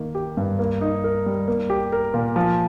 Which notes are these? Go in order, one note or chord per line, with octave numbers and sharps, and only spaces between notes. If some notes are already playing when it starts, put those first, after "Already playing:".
Already playing: D#3 A#3
G4
G2
A#3
D#4
A#4
G3
A#3
G4
A#4
A#2
F3